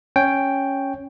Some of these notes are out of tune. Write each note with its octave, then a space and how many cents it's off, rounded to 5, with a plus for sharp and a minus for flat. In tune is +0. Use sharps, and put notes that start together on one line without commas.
C#4 +0 C#5 +0 G5 +0